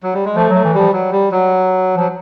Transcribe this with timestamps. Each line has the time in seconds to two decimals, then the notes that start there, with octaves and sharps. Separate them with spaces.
0.03 F#3
0.14 G3
0.25 G#3
0.36 F3 A3
0.49 F#3
0.55 A3
0.64 E3
0.74 F3 G3
0.93 F#3
1.12 G3
1.31 F#3
1.96 F3 F#3